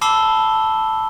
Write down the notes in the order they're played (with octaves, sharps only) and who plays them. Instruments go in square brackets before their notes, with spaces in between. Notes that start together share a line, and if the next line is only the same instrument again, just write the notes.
[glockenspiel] A5 B5 D6 E6 C7 G7